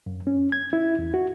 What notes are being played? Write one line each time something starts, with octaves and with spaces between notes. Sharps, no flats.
F#2
C#4
G#6
E4
E2
F#4